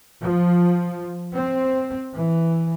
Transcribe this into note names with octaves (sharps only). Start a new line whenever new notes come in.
F3
C4
E3